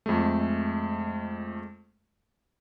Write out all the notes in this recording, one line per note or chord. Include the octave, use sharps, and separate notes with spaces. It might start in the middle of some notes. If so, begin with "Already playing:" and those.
F2 G#3 A3